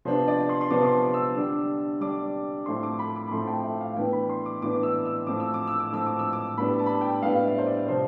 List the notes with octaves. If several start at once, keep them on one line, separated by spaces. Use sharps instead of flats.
C3 F3 B3 D4 C5
D5
C6
C6
C3 F3 B3 D4 D6
C6
D6
E6
D3 G3 D4
D3 G3 D4 D6
A2 F3 A3 C4 C6
D6
B5
D6
B5
A2 F3 A3 C4 C6
A5
G5
E5
F5
A2 E3 B3 D4 G5
B5
C6
D6
A2 E3 B3 D4 D6
E6
E6
A2 F3 C4 D6
E6
D6
E6
D6
A2 F3 C4 E6
D6
E6
D6
A2 G3 B3 D4 B5
A5
B5
A5
G5
A2 G3 B3 D4 F5
E5
C5
D5
C3 F3 C4 C5